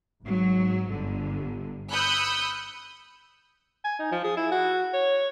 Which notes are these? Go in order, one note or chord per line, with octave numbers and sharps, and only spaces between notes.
G#1 G#2 F#3
G1 D3
B5 D#6 E6 F#6 G6 C#7
G#5
D#4
F3
G#4
E4
F#4
C#5